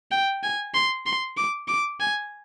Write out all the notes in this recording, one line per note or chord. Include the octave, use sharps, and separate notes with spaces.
G5
G#5
C6
C6
D6
D6
G#5